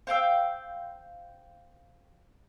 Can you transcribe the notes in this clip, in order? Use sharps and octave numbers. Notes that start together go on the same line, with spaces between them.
C5 F5 G5 E6